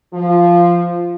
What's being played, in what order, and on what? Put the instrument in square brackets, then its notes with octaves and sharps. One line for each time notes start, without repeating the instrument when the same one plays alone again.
[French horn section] F3